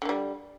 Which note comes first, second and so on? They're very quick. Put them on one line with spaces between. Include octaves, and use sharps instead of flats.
D3 A#3 G3